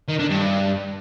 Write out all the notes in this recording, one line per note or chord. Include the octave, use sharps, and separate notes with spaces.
D#3
D3
G2